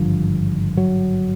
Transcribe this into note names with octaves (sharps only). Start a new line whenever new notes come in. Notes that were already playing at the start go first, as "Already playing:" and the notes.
Already playing: G#1 G2 D3 F3
F#3